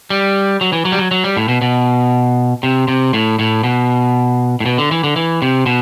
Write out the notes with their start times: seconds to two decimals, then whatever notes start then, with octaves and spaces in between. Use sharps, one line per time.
0.10 G3
0.61 F#3
0.73 E3
0.85 F#3
0.92 G3
0.99 F#3
1.11 F#3
1.24 G3
1.37 A2
1.48 B2
1.62 B2
2.63 C3
2.88 C3
3.13 A2
3.39 A2
3.64 B2
4.60 A2
4.66 B2
4.78 D3
4.91 E3
5.04 D3
5.16 E3
5.42 C3
5.66 B2